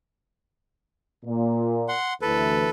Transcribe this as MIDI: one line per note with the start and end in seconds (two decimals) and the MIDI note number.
1.24 1.94 46
1.88 2.13 78
1.88 2.13 84
2.22 2.67 38
2.22 2.67 52
2.22 2.70 69
2.22 2.70 71